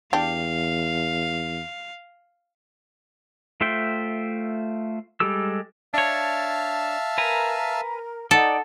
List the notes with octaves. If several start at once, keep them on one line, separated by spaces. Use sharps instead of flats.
E2 D4 G4 F5
A3 F4 C5 E5 G5
G3 G#3 G4 A4 E6
D4 C#5 E5 F5 A5
A#4 B4 G#5 A#5
D#4 A4 D5 F#5